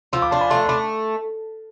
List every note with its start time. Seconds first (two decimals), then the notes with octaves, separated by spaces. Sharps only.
0.13 F3 C6 E6
0.22 B5 D6
0.31 D4 A5 C6
0.41 G#5 B5
0.50 A3 A5 C6
0.65 C6
0.69 A3 B5 D6